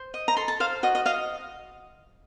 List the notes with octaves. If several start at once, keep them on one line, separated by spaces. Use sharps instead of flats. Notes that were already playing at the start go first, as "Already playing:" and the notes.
Already playing: C5
D#5
A#5
A4 C6
A5
C5 F5
F#4 D#5
D#5
D#5 F5